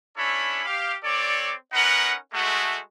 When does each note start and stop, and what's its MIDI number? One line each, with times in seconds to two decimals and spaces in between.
0.17 0.63 61
0.17 0.63 62
0.17 0.63 64
0.17 0.63 69
0.17 0.63 73
0.17 0.63 83
0.65 0.94 67
0.65 0.94 77
1.03 1.52 60
1.03 1.52 69
1.03 1.52 73
1.03 1.52 74
1.73 2.15 61
1.73 2.15 63
1.73 2.15 70
1.73 2.15 71
1.73 2.15 78
2.33 2.79 56
2.33 2.79 57
2.33 2.79 66